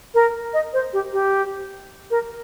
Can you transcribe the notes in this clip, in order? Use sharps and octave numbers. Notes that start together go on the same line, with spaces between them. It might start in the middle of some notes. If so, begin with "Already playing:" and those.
A#4
D#5
C5
G4
G4
A#4